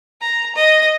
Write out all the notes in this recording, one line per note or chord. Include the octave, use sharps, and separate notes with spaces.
A#5
D#5